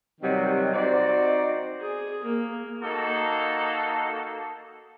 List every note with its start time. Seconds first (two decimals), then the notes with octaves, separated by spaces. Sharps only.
0.21 C3 D#3 F#3 G3 C4
0.72 C4 D#4 F#4 D5
1.81 G#4
2.24 A#3
2.82 A#3 D#4 F#4 A4